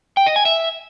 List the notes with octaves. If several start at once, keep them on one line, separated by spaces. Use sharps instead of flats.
G5
D#5
G#5
E5